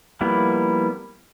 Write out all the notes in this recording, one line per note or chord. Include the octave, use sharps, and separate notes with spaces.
F3 G3 A#3 B3 E4